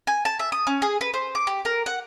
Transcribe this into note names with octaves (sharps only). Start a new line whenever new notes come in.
G#5
A5
E5
D#6
C#4
G#4
B4
C5
D6
G4
A#4
F#5